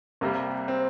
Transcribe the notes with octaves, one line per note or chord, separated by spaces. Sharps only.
C2 C3 G3 A#3
C4